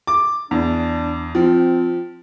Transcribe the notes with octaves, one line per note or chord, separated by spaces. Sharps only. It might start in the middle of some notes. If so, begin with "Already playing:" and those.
D6
E2 D4
F3 C4